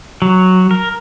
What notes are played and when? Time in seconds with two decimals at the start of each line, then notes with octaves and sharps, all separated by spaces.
0.22 F#3
0.71 A#4